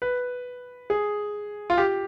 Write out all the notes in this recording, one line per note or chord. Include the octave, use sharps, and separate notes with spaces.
B4
G#4
F4
G4